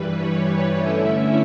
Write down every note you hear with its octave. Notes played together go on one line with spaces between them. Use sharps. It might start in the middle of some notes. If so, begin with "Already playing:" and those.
Already playing: G2 E3 G3 B4
C#5
D3 A3 C#4 E4 E5